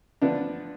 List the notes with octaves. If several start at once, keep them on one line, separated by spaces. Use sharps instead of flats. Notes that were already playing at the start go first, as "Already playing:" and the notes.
D3 F3 B3 D4